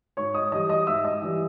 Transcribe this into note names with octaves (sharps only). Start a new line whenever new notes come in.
G#2 C#5 C#6
D#5 D#6
E3 G3 D#5 D#6
D#5 D#6
G#2 E5 E6
D#5 D#6
E3 G3